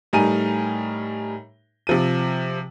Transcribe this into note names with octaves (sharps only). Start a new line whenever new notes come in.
A2 G3 D#4 A#4 G#5 D#7
C3 F3 D#7